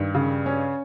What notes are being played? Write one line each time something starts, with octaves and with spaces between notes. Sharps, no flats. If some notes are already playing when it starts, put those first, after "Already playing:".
Already playing: G2 D#3
C#3
C#4